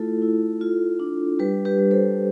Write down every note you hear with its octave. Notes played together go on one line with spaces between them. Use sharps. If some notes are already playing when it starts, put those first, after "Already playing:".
Already playing: A3 E4 F4 A4
E4
F4
D4
G3 G4 B4
G4 B4
G3
A4 C5